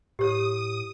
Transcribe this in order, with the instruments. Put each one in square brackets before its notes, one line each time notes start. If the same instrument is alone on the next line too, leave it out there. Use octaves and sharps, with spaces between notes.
[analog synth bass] A2 [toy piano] G4 C#5 [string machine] D#6